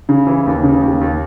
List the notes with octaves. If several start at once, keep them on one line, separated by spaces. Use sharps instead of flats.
C#3
E3
D#2
C#3
D#2
D#2